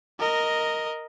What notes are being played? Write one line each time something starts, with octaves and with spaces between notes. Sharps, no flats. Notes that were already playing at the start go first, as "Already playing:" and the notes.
A#4 D#5